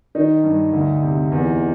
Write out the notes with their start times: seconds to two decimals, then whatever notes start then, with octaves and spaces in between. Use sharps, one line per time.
0.15 D#3 D#4
0.44 G2
0.73 D2
1.02 C3
1.32 E2